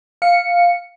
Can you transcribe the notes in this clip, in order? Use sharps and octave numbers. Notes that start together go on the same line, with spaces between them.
F5 C#7